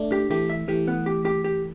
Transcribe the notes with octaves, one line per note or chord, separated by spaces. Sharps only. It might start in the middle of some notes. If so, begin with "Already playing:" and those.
Already playing: A3 D4
G4
E3 A3 G4
E5
E3 A3 G4
B3
G4
G4
G4